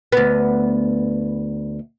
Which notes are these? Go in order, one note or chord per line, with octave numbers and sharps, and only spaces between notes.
D2 B3